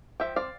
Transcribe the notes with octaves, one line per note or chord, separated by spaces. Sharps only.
F3 E5 G5
C4 D5 F5